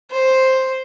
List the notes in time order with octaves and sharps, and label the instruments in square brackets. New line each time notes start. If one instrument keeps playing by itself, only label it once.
[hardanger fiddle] C5